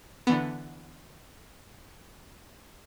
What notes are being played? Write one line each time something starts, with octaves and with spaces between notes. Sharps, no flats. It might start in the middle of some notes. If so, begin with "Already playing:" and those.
D3 E3 B3